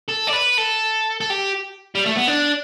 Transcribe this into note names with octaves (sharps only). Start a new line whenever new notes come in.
A4
D5
B4
A4
A4
G4
G3
A3
B3
D4